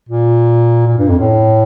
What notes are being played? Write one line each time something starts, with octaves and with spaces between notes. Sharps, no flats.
A#2
A#2
G2
F2
A2